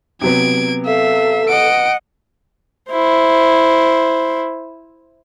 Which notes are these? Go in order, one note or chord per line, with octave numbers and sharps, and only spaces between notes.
C3 F#3 B3 G#6 D7
A4 E5 F5
D#5 F#5 D7
E4 C5